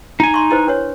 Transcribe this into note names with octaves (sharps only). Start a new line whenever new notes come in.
D#4 G#5
C6 C#6
E4 B4 C5
D4 B4 C#5